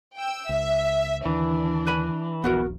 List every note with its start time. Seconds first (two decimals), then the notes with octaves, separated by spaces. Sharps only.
0.17 G5 E6
0.49 C#2 E5
1.26 D#2 D3 E3 D4
1.87 B4 G#5 B5
2.44 D#1 A#1 B3 F#4 A#4